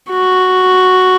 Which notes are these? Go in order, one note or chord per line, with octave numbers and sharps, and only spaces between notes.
F#4